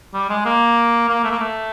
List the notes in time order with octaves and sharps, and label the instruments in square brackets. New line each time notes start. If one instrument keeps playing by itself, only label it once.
[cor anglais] G3
G#3
A#3
A#3
A3
A#3
A3